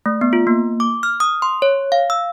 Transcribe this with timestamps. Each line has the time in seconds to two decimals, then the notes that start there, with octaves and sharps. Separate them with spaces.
0.06 A3
0.21 B3
0.33 F4
0.47 A#3
0.80 D6
1.03 F6
1.20 D#6
1.42 C6
1.62 C#5
1.92 F5
2.10 E6